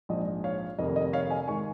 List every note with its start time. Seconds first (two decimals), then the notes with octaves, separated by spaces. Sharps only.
0.09 A#1 G#2 F3 D#5
0.44 C#5 F5
0.78 F1 F2 D#3 A#3 D#5
0.96 D#5
1.13 C#5 F5
1.30 D#5 G#5
1.47 G#2 D#3 G#3 G#5 C#6